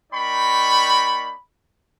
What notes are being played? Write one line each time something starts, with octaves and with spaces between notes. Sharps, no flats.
A#3 D#4 D5 G5 B5 C#6